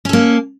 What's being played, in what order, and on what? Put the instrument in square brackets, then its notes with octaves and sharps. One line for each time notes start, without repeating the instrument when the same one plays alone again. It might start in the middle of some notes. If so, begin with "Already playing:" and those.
[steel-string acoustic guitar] C#4
A4
A#3